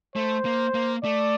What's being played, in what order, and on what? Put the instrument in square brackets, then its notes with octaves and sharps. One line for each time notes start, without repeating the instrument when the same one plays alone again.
[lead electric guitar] A3 [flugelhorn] C5
[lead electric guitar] A#3
A#3
[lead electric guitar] A3 [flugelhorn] D5